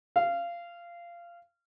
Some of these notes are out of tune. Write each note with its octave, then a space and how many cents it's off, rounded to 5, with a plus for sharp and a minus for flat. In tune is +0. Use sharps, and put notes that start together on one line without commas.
F5 -20